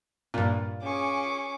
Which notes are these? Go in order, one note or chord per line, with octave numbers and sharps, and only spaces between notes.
G2 A#2 F4
C#4 G#4 C#6 D6